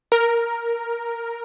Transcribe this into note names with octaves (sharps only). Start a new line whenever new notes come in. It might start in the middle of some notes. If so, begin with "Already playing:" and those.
A#4